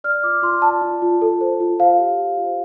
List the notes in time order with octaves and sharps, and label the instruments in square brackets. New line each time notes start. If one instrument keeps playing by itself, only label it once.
[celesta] D5 F6
F4 D6
F4 C6
D5 A5
F4
F4
A4
C5
F4
C5 F5
G4
G4
F4